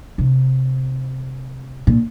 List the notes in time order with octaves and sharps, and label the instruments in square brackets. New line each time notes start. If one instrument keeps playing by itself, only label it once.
[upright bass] C3
A#2